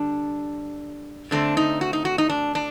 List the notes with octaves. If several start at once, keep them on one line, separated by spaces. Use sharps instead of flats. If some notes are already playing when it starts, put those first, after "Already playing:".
Already playing: D3 G3 D4
D3 A3 C4 D4
D#4
F#4
D#4
F#4
D#4
D4
D4